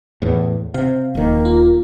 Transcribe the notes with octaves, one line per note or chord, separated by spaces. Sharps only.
E2 A2
C3 F5
D#1 D#3 A#3
F4